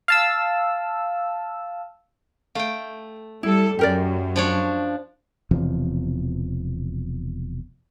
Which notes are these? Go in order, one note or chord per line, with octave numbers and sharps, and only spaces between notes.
F5 A5 E6
A3 F5 G5
G3 E4 A4
F#2 G4 A#4 D5
F3 D4 C#5
E1 E2 C3 F3